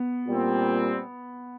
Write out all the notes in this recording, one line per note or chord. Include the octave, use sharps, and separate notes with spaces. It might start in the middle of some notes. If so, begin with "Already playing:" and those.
Already playing: B3
A#2 G3 C4